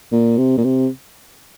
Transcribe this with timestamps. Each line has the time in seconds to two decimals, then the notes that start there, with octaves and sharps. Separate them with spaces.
0.12 A#2
0.38 C3
0.57 A#2
0.64 C3